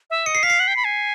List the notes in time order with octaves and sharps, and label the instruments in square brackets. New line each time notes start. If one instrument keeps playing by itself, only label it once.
[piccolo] E5
[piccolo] D#5 [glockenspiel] C#7
[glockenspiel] C7
[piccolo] F5 [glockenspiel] B6
[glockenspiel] C7
[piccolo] F#5
G5
B5
G#5